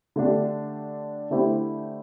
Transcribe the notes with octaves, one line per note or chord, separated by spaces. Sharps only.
D3 A3 D4 G4
D3 A3 E4 G4 C5